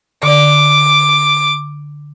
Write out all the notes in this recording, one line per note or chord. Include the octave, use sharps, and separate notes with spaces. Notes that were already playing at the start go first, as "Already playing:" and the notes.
D3 D5 D6